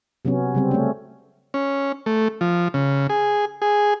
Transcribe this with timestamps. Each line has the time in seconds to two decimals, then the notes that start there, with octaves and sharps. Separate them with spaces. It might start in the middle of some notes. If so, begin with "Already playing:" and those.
0.25 C3 F#3 B3 C#4
0.55 C#3 G3 C4
0.71 A3 C#4
1.54 C#4
2.06 A3
2.41 F3
2.74 C#3
3.10 G#4
3.62 G#4